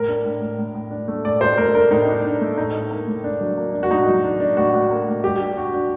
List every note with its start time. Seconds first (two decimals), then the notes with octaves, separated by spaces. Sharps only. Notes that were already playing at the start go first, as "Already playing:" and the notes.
Already playing: A2 A#4
0.08 D4
0.25 A2
0.41 A2
0.58 A2
0.74 A2
0.91 D4
1.08 A3
1.25 A2 D5
1.41 A2 C5
1.58 A3 A#4
1.74 D4 A#4
1.91 A2 D#4
2.08 D4
2.24 D4
2.41 A3
2.58 A2 D#4
2.74 A2
2.91 A#3
3.07 A2
3.24 D4
3.41 F#3
3.57 A#3
3.74 D4
3.83 F#4
3.91 A2 D#4
4.07 F#3
4.24 D4
4.40 D4
4.57 A2 F#4
4.74 A2
4.90 A#3
5.07 A2
5.24 G3 G4
5.40 D4
5.57 D4 F#4
5.73 D4